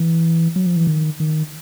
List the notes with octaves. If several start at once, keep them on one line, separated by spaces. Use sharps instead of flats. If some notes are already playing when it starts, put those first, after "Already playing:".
Already playing: E3
F#3
F3
E3
D#3
D#3